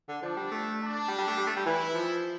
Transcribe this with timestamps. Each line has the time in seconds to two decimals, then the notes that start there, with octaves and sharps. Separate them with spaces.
0.09 D3
0.23 F3 D4
0.37 G3
0.52 A3
0.80 D4
1.08 G3
1.19 G3
1.27 A3
1.37 G3
1.47 A3
1.57 G3
1.66 E3 E4
1.94 F3